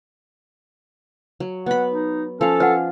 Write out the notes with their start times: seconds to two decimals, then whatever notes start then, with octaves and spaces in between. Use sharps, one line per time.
1.40 F#3
1.66 B3 F#5 B5
1.91 D#4
2.41 F3 C#4 A4 F5
2.60 F4 B4 F#5